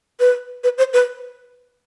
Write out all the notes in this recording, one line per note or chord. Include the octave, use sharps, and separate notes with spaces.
B4
B4
C5
B4